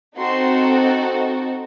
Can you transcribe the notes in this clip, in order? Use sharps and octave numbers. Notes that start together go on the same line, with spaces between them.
C4 D#4 F#4 A4 C6